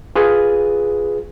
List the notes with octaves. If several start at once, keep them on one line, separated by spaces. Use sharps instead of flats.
F4 G#4 B4